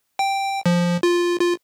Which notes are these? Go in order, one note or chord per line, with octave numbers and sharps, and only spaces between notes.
G5
F3
F4
F4